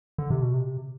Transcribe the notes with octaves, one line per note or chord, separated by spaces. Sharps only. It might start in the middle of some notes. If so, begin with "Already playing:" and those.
D3
C3
B2
C3